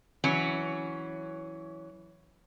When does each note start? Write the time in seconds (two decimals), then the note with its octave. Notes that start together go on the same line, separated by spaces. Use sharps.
0.24 E3 F#3 C#4